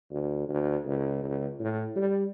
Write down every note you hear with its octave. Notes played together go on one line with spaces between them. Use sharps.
D2
D2
C#2
C#2
A2
G3